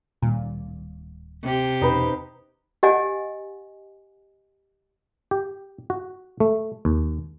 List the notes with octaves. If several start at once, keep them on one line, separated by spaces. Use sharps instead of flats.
D1 A#2 D#3 G3
C3 G4
E2 B2 C#4 D#4 B4 C5
G4 D#5 F#5 G#5
G4
F#4
A3
D#2